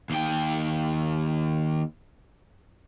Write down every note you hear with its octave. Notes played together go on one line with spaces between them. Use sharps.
D#2 G5